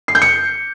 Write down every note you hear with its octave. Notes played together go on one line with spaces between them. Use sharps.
C7
G6
C#7